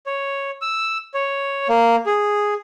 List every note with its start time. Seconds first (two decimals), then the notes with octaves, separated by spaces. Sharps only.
0.06 C#5
0.62 E6
1.14 C#5
1.69 A#3
2.06 G#4